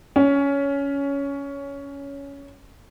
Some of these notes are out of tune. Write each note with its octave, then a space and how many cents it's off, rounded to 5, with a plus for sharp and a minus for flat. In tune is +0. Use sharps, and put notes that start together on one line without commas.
C#4 +15